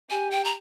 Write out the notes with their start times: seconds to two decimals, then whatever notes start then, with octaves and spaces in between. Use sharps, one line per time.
0.10 G4 G#5
0.31 G5
0.45 A#5